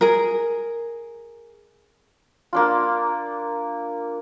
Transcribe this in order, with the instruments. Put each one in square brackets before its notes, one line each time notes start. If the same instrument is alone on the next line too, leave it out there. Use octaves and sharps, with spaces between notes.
[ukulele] G#4 A#4
[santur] A#3 D4 F4